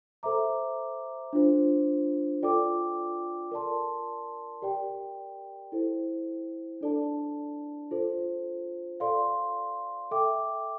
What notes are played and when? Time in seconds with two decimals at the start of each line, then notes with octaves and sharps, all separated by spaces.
0.23 A4 C5 E5 A#5 D6
1.33 D4 F4 C5
2.43 F4 A4 D5 G5 D6
3.51 A#4 D5 A5 C6
4.62 G4 A#4 D5 G5
5.72 E4 A4 C5
6.81 D4 A4 D5 A5
7.91 F4 A4 C5
9.00 A4 D5 F5 C6
10.11 A4 E5 G5 D6